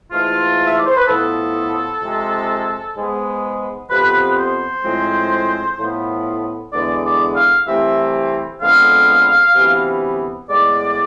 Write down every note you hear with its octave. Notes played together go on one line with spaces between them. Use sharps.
G#2 E3 A3 F4
E5
D5
C5
B4
A2 F3 B3 A4
F2 C3 G#3
G#2 G#3 B3
F2 C3 F3 B3 B4
C5
A2 F3 G#3 C4
A2 F3 B3
E2 D3 G#3 B3 D5
D5
F5
C2 C3 E3 A3 C4 E5
F2 D3 G#3 B3 F5
D2 C3 E3 B3
A2 G#3 B3 D5